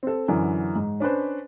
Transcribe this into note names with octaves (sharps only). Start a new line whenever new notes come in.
C4 A4
F#2 D3 E3
G#2
C#4 D4 B4 C5